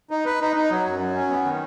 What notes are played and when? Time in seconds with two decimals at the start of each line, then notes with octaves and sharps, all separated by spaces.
0.11 D#4
0.25 B4
0.41 D#4
0.56 D#4
0.71 F#3
0.86 F#2
1.00 F#3
1.15 C#4
1.30 B3
1.44 D#3